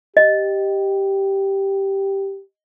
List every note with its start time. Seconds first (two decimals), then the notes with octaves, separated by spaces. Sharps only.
0.17 G4 D#5